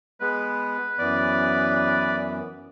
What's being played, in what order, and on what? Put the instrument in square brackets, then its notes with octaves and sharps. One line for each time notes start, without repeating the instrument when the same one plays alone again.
[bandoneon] G#3 B3 [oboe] B4
[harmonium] F#2 E3 B3 [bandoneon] D5